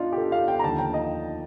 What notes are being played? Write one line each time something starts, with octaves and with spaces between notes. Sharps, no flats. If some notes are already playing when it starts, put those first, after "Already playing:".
Already playing: D4 D#4 F4
G4
A4
F5
G5
A#5
D#2 D3 F3 A5
G5
D#5